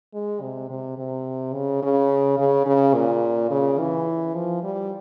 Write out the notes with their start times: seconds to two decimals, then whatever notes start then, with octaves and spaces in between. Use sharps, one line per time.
0.14 G#3
0.41 C3
0.69 C3
0.98 C3
1.54 C#3
1.82 C#3
2.38 C#3
2.66 C#3
2.94 A#2
3.51 C#3
3.79 E3
4.35 F3
4.63 G3